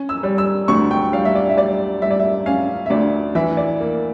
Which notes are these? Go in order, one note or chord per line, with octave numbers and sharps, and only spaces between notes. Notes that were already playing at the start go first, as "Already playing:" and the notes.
Already playing: C#4
E6
G3
E6
D2 C#6
G5
G3 F5
E5
D5
E5
G3 D5
G3 E5
D5
E5
C#4 F5
E5
D2 D5
E3 E5
D5
A#3